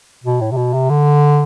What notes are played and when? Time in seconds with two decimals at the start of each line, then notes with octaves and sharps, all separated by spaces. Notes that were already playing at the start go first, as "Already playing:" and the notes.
0.24 B2
0.41 A2
0.51 C3
0.57 B2
0.74 C3
0.90 D3